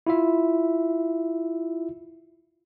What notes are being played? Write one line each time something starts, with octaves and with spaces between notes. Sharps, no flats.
E4 F4 E5